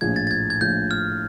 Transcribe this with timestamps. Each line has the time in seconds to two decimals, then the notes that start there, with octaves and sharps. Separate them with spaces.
0.01 A#1 A2 F3 G#6
0.16 A6
0.27 A6
0.31 G#6
0.50 G#6
0.61 A#1 A2 F3 G6
0.91 F6